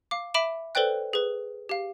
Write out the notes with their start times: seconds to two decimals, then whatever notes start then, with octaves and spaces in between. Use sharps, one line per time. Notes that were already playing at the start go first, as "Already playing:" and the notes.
0.11 F5 D6
0.34 E5 B5 D6 D7 E7
0.75 A4 B4 C5 D5 G5 F#6
1.13 G#4 B4
1.69 G4 F5